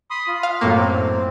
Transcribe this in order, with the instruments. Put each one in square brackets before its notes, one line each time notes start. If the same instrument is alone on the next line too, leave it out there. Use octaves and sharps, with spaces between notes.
[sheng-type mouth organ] B5 C6 D#6
F4
[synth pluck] F5
F#2 A2 A#3
[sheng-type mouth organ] C4